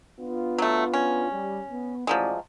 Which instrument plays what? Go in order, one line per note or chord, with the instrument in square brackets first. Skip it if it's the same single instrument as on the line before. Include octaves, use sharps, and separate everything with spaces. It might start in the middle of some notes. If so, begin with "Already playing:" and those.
[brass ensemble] B3 D4 F4
[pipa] F#3 A3
C#4
[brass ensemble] G3
B3
[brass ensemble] A1 D5 [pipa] F3 F#3 G#3